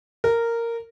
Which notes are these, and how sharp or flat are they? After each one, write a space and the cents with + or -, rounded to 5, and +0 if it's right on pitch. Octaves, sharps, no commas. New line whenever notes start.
A#4 -10